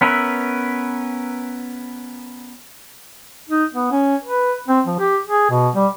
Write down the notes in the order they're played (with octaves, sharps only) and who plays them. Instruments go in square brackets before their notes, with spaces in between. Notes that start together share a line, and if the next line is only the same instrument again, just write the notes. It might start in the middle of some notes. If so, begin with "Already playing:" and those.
[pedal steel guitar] B3 C#4 A#4 B4 E5
[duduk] D#4
B3
C#4
B4
C4
F3
G4
G#4
B2
G3